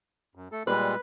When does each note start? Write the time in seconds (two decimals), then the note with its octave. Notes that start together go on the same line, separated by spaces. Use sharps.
0.35 F#2
0.52 A3 A4
0.67 A#2 G3 G#3 B4